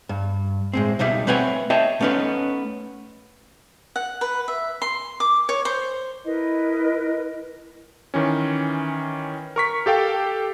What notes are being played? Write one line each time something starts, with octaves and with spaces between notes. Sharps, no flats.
G2
A2 G#3 C4
C#2 B2 G3 D#4 E5
A3 C4 B4 C#5 F#5 G#5
C#5 D#5 E5 G5 A5
A3 B3 C#4 D#4 B4
F#5
B4
E5
C6
D6
C#5
C5
E4 A#4 B4 D#5
D#3 E3 C#4
A#4 C#6 B6
G4 A4 F5 G5